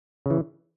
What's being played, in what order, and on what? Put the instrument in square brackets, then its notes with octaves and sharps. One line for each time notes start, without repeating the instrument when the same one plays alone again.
[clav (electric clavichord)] C#3 E3